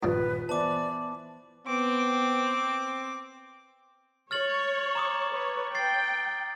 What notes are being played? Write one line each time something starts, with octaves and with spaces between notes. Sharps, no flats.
D#1 G2 C#3 F3 B4
E3 B3 C5 D5 A5 D6
B3 C4 D6
C#5 F6 A6 F#7
A#5 D6 D#6
B4 C#5
G5 A6 C7